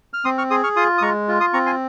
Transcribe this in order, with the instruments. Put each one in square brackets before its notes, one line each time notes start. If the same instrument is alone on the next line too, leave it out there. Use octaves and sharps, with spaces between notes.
[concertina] F6
C4 C6 D#6
C#6 F6
G#4 C6 D#6
C#6 F6
F4 C6 D#6
D#6
G#3 A#5 C#6
F4
C6 D#6
C4 A#5 C#6
G#5 C6